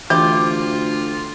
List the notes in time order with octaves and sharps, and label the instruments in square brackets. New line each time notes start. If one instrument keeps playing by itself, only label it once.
[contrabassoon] D2 [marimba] E3 [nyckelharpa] F4 [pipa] G4